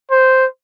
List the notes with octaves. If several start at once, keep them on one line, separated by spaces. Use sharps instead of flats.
C5